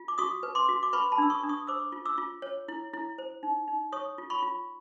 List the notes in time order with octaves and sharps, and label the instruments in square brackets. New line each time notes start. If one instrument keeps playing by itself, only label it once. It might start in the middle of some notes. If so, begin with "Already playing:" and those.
Already playing: [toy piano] F4
D6
F#4 C#6 D#6
B4
C6 D6
F#4
D6
B4 B5 C#6
A5 B5
D4 E6
C#6 D#6
D4
C#6 D#6
C5 D6 E6
F4
D6 E6
F4
C#5
E4
E4
C5
D#4
D#4
C#5 C#6 D#6
F4
B5 C#6
F4